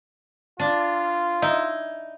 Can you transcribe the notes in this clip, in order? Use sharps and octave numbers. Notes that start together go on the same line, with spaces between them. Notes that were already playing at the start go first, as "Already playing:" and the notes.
D4 F4
D#4 E4